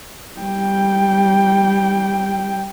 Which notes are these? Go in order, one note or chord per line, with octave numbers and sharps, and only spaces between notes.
G3 G5